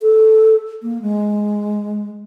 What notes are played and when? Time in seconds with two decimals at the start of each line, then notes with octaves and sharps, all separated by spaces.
0.02 A4
0.82 A#3
1.02 G#3